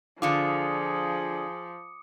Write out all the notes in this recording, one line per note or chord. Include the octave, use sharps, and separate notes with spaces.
D3 F3 D4 F4 G#4 D6 D#6 C#7